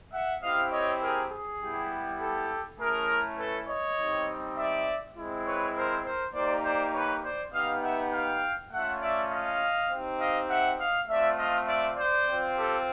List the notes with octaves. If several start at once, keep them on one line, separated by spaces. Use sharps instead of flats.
E5 F#5
C4 E4 G4 D#5 F5
C#5 D#5
G#4 A#4
G#4
G3 B3 E4 G4
G4 A4
A3 C#4 E4 G#4 A#4
A4 B4
C#5 D#5
G3 C4 D#4
D5 E5
G#3 C4 E4
B4 C#5
A#4 C5
A#4 C5
A#3 D#4 G4 C5 D5
C5 D5
B4 C#5
C5 D5
B3 D#4 G4 D#5 F5
E5 F#5
F5 G5
A3 C#4 F4 E5 F#5
D5 E5
D#5 F5
C4 D#4 G4
D#5 F5
E5 F#5
D#5 F5
A3 C4 F4 D5 E5
D#5 F5
D5 E5
C5 D5
C4 F4
G4 A4